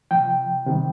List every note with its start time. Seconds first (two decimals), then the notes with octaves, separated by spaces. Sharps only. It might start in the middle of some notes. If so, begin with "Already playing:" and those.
0.11 C3 F3 G5
0.66 C3 D#3 G3